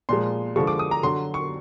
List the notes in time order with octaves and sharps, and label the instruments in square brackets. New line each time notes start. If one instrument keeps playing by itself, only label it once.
[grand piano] A#2 F3 G#3 C6
D3 F3 G#3 C#6
D6
D#6
A#5
D3 F#3 C6
C#6